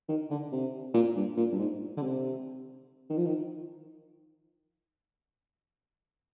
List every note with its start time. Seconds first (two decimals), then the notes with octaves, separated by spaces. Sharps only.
0.09 D#3
0.30 D3
0.52 C3
0.94 A#2
1.16 G2
1.37 A#2
1.52 G2
1.58 G#2
1.97 D3
2.02 C3
3.10 D#3
3.17 F3
3.26 D#3